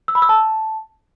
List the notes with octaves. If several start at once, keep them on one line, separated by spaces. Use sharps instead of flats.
E6
B5
E6
A5